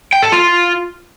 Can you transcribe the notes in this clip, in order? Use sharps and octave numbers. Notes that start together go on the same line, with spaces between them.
G5
A4
F4